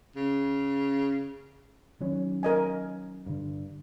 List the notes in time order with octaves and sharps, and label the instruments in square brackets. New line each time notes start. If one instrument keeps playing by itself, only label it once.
[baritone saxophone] C#3
[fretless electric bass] D#3 F#3 C#4
[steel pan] A#4 D#5 G#5
[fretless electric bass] G2 D3